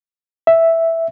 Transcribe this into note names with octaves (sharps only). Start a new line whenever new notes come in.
E5